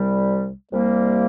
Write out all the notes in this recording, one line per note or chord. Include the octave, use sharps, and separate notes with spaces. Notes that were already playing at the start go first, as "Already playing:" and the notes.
Already playing: C2 C3 G3
C2 C3 G3 A#3